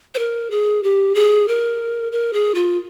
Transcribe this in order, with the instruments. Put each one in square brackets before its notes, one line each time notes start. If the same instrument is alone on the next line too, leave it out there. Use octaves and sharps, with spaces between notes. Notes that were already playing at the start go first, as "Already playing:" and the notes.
[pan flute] C5
A#4
G#4
G4
G#4
A#4
A#4
G#4
F4